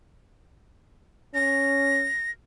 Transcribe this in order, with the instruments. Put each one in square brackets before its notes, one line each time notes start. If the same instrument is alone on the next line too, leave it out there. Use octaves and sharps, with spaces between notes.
[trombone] C#4 [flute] A#6